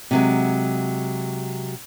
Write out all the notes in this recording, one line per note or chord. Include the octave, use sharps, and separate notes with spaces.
C3 F#3 G#3